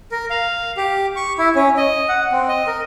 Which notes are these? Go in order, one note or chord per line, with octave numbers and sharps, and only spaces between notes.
A#4
F5
G4
C#6
E4
C#4
D#5
F#5
C4
D#5
A#4